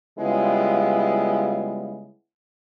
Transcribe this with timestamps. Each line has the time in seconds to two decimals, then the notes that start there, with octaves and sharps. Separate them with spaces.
0.19 C#3 G3 G#3 B3 E4 F4